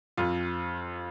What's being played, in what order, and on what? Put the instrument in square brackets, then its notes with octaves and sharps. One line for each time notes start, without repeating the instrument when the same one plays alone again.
[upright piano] F2 F4